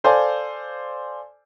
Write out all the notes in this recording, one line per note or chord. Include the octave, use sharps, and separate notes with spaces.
A4 C5 D5 F5 G#5